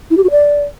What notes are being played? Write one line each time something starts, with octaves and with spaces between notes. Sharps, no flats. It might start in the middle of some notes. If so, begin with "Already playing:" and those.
E4
G4
F#4
D5